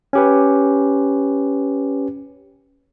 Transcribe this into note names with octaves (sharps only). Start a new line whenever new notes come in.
C#4 G4 B4